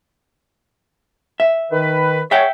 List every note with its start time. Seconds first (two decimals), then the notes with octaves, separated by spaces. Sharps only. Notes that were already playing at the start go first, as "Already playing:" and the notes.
1.40 E5
1.72 D#3 B4
2.31 G#4 C#5 E5 F#5 G5